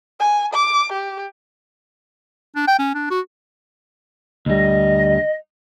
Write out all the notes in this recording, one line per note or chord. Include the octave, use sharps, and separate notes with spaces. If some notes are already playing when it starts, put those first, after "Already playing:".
G#5
D6
G4
D4
G5
C#4
D4
F#4
D2 G3 D#5